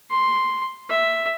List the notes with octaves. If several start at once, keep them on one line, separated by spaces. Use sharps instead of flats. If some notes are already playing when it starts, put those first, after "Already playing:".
C6
E5